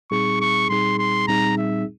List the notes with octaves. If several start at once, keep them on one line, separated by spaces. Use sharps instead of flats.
A#2 G3 C4 D#4 G#4 C#6
C#6
A#2 G3 C4 D#4 G#4 C6
C6
A#2 G3 C4 D#4 G#4 A#5
E5